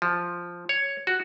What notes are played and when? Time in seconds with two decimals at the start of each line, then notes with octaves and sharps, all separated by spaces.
0.02 F3
0.69 C#5
1.07 F#4